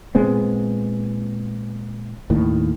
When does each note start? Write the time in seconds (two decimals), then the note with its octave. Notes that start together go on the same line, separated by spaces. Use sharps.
0.15 A#2 G#3 B3 C4
2.30 D#2 A2 D#3